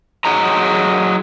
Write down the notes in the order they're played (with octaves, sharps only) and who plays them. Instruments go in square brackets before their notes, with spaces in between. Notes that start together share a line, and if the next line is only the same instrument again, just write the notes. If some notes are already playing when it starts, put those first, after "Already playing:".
[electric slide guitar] F#3 G#4 D#5 A#5